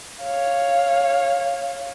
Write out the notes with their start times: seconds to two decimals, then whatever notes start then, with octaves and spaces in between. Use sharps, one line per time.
0.21 C#5 F5